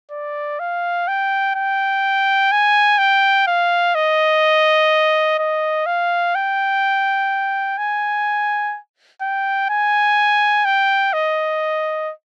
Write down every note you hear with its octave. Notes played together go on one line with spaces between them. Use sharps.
D5
F5
G5
G5
G#5
G5
F5
D#5
D#5
F5
G5
G#5
G5
G#5
G5
D#5